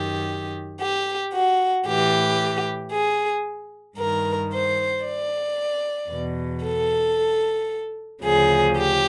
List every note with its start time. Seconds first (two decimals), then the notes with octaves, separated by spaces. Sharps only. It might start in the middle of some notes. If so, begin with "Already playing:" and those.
Already playing: F#2 D#3 G4
0.79 G4
1.32 F#4
1.86 A2 E3 G4
2.91 G#4
3.97 G2 D#3 A#4
4.51 C5
5.04 D5
6.11 E2 B2
6.64 A4
8.22 D2 C#3 F3 G#4
8.76 G4